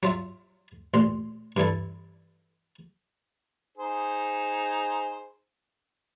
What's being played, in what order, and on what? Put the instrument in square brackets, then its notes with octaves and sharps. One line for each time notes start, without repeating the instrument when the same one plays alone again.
[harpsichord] F#3 F4 E5
A1 A#2 C6
G2 E3 E4 A4
[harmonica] D#4 G#4 C5